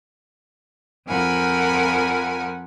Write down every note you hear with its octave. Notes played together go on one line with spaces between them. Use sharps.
F2 F3 A#4 F#5 G#5 B5